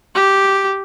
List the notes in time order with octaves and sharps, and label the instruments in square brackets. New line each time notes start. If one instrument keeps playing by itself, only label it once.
[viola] G4